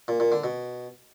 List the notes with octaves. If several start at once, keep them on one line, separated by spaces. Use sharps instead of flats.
A#2
A#2
D3
B2